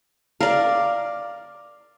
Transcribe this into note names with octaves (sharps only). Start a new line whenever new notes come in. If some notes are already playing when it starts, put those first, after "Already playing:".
A#4 D5 F5